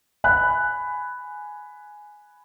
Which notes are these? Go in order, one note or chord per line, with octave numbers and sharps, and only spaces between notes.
G#5 B5 F#6